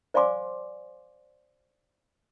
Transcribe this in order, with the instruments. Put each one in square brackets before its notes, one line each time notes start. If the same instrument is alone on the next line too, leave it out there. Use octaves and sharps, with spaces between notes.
[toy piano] C5 D5 F5 G#5 C6 D6